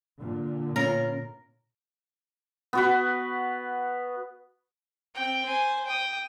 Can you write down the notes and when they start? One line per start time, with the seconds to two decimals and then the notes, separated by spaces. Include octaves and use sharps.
0.18 A#2 D3
0.76 B3 C#4 F4 A#4
2.73 B3 F#4 B4
5.15 C4 G5
5.46 C5 G#5
5.86 G5 D#6